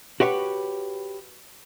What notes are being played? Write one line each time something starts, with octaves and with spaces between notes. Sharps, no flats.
F#4 G4 B4 C#5